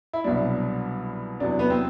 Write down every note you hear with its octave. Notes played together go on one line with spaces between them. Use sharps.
E4
C2 B2 F#3 D4
E2 C3 F#3 D4
B3
C4